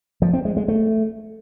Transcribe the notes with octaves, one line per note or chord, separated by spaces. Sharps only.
F3
C4
G#3
G#3
A3